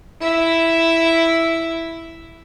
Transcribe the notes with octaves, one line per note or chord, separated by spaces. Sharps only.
E4 E5